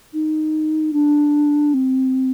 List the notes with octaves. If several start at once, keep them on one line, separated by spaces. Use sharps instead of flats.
D#4
D4
C4